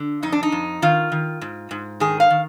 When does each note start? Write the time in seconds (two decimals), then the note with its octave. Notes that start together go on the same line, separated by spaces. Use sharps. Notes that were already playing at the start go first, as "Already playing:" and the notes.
Already playing: D3
0.23 F2 D#4
0.32 D4
0.43 D#4
0.52 F2
0.82 D#3 F4
1.12 D#3
1.41 G#2
1.71 G#2
2.00 D#3 G#4
2.20 F5
2.30 D#3